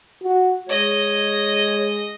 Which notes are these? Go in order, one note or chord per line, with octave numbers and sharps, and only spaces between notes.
F#4
G#3 C#5 D#5